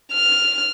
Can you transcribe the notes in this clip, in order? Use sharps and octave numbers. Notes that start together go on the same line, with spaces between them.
F6